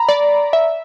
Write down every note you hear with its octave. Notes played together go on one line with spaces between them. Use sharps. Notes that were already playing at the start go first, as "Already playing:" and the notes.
Already playing: A#5 B5
D5
E5